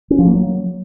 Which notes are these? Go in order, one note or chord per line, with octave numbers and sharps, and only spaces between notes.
C#4
F3
A#3
F#3